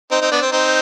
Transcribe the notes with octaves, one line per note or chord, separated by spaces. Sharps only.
C4 D#4
C4 D#4
B3 D4
C4
C4 D#4